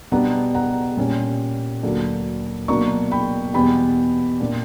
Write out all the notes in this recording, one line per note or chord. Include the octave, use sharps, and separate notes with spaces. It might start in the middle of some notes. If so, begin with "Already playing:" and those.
B2 G3 B3 D4 F#5 A#5
F#5 A#5
A#2 G3 C#4
D2 D3 F#3 A#3 D4
B2 F#3 A#3 D4 A#5 C#6
G5 B5
E2 B2 G3 B3 G5 B5
A#2 A#3 D4